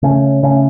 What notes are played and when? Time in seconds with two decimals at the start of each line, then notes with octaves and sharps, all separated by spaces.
0.02 C#3 A3 C#4
0.43 C#3 A3 C#4